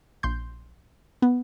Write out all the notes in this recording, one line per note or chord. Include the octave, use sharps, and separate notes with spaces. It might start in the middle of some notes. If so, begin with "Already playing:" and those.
A#1 C6 G6
B3